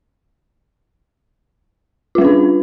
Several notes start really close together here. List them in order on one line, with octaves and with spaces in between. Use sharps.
F4 G3 B4 D4